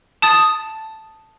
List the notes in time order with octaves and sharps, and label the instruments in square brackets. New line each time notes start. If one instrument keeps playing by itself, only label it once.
[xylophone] A5 D#6 A6